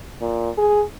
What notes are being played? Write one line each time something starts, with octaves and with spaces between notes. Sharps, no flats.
A#2
G#4